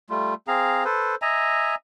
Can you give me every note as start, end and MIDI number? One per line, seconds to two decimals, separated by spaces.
0.10 0.34 55
0.10 0.34 57
0.10 0.34 65
0.48 0.84 60
0.48 0.84 68
0.48 0.84 77
0.48 0.84 82
0.85 1.15 69
0.85 1.15 71
0.85 1.15 72
1.22 1.75 75
1.22 1.75 76
1.22 1.75 80
1.22 1.75 82